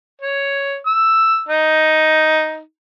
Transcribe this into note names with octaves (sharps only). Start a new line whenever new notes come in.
C#5
E6
D#4